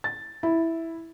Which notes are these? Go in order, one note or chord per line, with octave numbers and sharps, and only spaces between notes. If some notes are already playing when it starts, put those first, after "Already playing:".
A6
E4